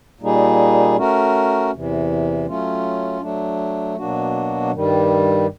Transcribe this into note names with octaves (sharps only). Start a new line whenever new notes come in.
A#2 G3 A#3 D#4 G#4
A3 C#4 F#4 A#4
E2 C3 E3
F#3 A3 C#4 F4
F#3 A3 D4
B2 F#3 A#3 D4 F#4
G2 D#3 G3